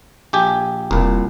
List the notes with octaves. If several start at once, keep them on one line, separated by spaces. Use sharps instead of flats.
A#1 G4 G#5
E1 C2 A#2